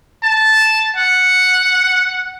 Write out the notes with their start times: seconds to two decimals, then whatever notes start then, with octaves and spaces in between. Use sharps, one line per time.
0.23 A5
0.96 F#5